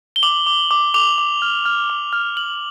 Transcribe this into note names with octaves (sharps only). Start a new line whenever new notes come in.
G7
D6 F#7
D6
D6
D6 F7
D6
F6
F6
D6
F6
F6 F#7